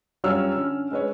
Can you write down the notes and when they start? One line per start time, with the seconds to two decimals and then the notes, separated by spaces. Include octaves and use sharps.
0.24 F#2 G3 F4 C#5 E6 F6
0.56 D3 C#4
0.91 G#3 B4 C#5